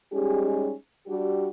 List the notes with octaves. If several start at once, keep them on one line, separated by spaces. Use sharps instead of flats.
G3 G#3 C#4 D#4 G4 G#4
G3 D4 F#4 G4